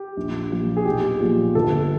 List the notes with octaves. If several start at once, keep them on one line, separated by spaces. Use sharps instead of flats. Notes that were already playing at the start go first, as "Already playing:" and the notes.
Already playing: G4
A#1
A#2 F3
G#4
B1 G4
A#2 F3
G1 A4